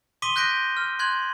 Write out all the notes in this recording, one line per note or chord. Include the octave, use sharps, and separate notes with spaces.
C6 D6 D#6 B6 D#7 G7
F#6 G6 A#6 B6 D7
F6
C6 F#6 G#6 F#7